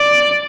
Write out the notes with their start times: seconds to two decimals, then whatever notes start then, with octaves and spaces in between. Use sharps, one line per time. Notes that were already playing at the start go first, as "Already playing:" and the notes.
Already playing: D5